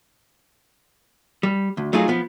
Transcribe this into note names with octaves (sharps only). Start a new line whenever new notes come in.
G3
D2
F#3 A3 D#4 F4 G#4
F3 B3